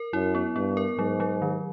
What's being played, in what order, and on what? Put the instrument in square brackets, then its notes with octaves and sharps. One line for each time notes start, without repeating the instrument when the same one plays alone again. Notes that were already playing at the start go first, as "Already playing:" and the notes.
Already playing: [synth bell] A#4
[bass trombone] F#2 [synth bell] E4
[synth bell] B3
[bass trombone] G2 [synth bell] B3
[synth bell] A#4
[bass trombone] G#2 [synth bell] F#3
[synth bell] F#3
D#3